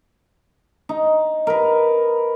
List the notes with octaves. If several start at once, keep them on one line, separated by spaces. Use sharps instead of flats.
D#4
A#4 B4